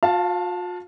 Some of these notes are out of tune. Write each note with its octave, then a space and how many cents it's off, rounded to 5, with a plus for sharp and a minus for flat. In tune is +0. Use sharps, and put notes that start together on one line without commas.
F4 +45 F5 +0 A5 +0